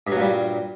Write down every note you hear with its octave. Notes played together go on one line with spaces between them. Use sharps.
G2 A#2 F#3 G3